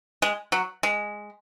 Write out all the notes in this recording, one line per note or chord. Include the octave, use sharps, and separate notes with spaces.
G#3
F#3
G#3